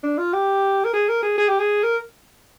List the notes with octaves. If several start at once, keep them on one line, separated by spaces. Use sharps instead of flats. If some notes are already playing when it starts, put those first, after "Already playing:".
D4
F4
G4
A#4
G#4
A#4
G#4
G#4
G4
G#4
A#4